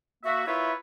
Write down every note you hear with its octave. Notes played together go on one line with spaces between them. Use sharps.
A#3 F#4 E5
A#3 E4 F4 B4 C#5 E5